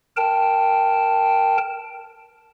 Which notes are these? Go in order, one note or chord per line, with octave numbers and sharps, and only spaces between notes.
A#4 G5 A5